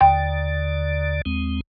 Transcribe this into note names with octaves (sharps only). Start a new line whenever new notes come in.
D#2 D3 D5 G5
D#2 G#3 C4